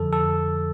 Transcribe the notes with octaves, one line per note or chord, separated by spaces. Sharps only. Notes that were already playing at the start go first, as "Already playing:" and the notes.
Already playing: F2 D3 F3 A4
A4